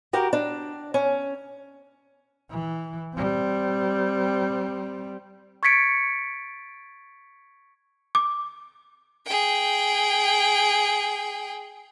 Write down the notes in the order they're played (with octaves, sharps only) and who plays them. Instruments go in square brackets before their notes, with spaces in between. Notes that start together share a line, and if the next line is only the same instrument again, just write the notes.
[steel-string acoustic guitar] F#4 G4 A#4
D4
C#4
[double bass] E3
G3 C4
[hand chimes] C#6 G#6 A6 B6 C#7 D7
[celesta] D6
[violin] G#4 G5